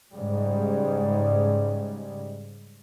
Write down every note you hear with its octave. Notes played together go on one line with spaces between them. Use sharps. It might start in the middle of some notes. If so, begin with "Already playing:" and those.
G#2 C#3 G3 G#3